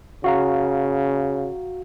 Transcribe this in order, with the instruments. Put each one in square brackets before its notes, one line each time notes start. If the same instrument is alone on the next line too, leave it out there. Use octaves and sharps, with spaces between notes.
[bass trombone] C#3 [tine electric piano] F#4 F5 A#5